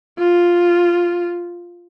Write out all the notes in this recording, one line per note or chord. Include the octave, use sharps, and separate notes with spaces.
F4